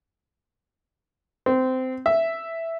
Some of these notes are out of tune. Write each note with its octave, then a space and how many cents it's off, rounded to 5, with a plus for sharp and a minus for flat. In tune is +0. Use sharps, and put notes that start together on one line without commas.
C4 -20
E5 +0